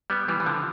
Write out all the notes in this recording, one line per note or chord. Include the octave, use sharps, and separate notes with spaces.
G3 B3
E3 G3
E3
D3 F3